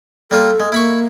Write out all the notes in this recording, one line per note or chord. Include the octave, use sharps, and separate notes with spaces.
G3 A#3 F4 A4
G#3
A#3 E4 B5 C#6